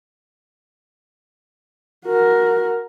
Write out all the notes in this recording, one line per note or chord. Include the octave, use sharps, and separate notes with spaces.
F#4 A#4